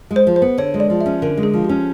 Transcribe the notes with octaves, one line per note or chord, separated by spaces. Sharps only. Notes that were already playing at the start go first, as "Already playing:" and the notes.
G#3
C5
F3
C5
B3
D3 C#5
G#3
D5
F3
E5
C#4
D3 A#4
G#3
G#4
F3
C#4 G4